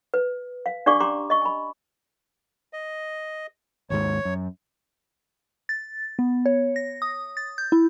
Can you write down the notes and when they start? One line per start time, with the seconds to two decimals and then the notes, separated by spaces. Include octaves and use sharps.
0.14 B4
0.66 F5
0.86 D4 G4 D5 F5 C#6 D6
1.00 C#4 G4 A#5 C6 D6
1.30 D#5 C#6
1.42 G#5 B5
2.73 D#5
3.90 G#1 D#2 G#2 C#5
4.25 F#2
5.69 A6
6.19 B3
6.46 C#5
6.76 A#6
7.02 D#6
7.37 A6
7.58 G6
7.72 E4